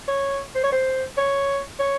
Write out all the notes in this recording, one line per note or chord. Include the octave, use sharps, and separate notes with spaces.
C#5
C5
C#5
C5
C#5
C#5